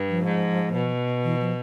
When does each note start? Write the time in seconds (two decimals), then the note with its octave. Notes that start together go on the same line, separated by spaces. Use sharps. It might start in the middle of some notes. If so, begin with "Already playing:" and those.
Already playing: G2
0.09 F3
0.25 G#2
0.74 B2
1.24 E3
1.40 F3